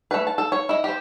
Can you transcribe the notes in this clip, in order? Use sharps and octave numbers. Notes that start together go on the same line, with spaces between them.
A3 B4
A5
A4
C#5
E4 D#5
G4 C5